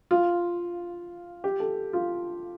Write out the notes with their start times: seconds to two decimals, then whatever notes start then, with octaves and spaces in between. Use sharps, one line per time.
0.11 F4
1.44 G4
1.60 A4
1.93 F4